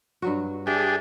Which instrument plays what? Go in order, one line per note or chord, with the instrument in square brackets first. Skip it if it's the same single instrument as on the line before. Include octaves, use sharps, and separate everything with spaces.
[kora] G2 F#3 F#4
[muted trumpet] D4 [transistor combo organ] G4 G#4 [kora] E5